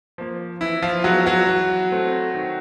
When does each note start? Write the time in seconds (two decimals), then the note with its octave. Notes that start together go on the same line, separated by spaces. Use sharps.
0.18 F3 A#3
0.61 E3 E4
0.82 F3 F4
1.04 F#3 G#3 B3 F#4
1.26 F#3 F#4
1.48 E3
1.92 A3 C4
2.35 D#3